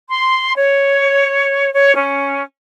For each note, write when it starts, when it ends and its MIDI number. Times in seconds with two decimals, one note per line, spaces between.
0.10 0.53 84
0.57 1.72 73
1.73 1.94 73
1.95 2.42 61